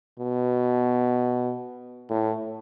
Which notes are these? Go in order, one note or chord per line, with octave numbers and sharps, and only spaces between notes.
B2
A2